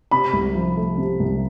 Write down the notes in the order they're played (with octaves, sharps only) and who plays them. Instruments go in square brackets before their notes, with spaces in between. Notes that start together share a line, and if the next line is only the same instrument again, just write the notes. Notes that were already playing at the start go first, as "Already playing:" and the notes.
[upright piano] C3 [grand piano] B5
[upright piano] C2
F3
A3
C3
C2